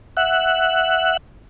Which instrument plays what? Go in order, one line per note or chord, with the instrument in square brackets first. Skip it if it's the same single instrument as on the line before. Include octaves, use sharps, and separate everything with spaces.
[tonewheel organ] E5 F#5 F#6